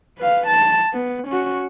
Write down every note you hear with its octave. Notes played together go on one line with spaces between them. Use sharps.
B4 F5
A5
B3
C#4 F#4